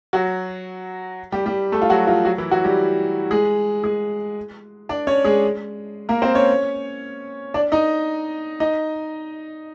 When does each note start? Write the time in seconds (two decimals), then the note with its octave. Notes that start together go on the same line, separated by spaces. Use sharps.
0.13 F#3 F#4
1.32 G3 G4
1.46 G3 G4
1.72 A3 A4
1.82 F4
1.90 F#3 F#4
2.07 F3 F4
2.25 F#3 F#4
2.38 E3 E4
2.51 F#3 F#4
2.64 G3 G4
3.31 G#3 G#4
3.84 G#3 G#4
4.89 D4 D5
5.07 C#4 C#5
5.24 G#3 G#4
6.09 A#3 A#4
6.22 C4 C5
6.35 C#4 C#5
7.54 D4 D5
7.72 D#4 D#5
8.60 D#4 D#5